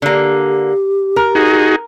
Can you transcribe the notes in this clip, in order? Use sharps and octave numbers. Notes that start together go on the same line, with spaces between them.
D3 A#3 G4
A#4
D#4 F#4 G#4